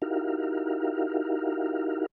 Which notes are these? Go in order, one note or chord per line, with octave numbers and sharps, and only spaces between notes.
D#4 E4 F#4 G4 A#4 F5